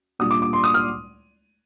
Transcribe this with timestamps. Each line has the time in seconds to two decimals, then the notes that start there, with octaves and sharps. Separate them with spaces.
0.19 A#2 G3 D4 F4 D#6
0.31 D6
0.42 D6
0.53 C6
0.64 D#6
0.74 F6